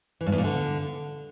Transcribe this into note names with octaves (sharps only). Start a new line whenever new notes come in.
E3
G2
E2
A#2
D3